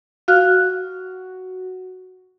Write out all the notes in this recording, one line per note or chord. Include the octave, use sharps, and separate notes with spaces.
F#4 F5 F6 F#6